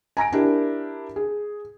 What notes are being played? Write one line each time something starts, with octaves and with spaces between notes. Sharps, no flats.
G#5 A#5 A#6 D7
D4 E4 G4 A#4
G#4